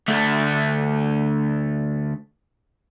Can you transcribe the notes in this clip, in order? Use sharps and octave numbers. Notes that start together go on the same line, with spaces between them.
D2 A3